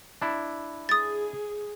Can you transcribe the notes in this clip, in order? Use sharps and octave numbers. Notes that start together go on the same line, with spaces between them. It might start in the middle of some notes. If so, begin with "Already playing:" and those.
D4 E4
G#4 D#6 A6